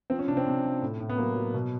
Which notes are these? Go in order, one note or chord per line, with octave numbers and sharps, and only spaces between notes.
F3 C4
C#4
C3 D4
C4
C3
F3
A2
A2
B3
F#3 A#3
F#3
B2